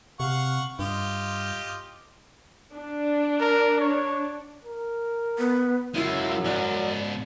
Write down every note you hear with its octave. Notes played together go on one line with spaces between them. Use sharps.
C3 F5 F#5 C#6
G2 F4 G4 D#5
D4
A#4
C#5
A#4
B3
F#2 G#3 E4 F4
G#2 C#4 D5